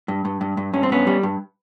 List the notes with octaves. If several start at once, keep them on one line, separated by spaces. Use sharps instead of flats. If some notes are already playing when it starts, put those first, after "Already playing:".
G2
G2
G2
G2
G2 C#4
C4
G2 B3 C#4
G3
G2